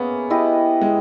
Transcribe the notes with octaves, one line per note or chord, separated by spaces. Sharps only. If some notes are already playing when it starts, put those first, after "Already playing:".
Already playing: A#3 B3 C#4 G#4 E5
E4 G4 B4 D#5
G#3